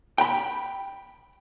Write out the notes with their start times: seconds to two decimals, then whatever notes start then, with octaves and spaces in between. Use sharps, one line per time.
0.18 G5 B5